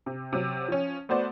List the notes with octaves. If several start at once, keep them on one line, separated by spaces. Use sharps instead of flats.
C3
C3 F#3
F3 C#4
A3 B3 F#4 C5 D5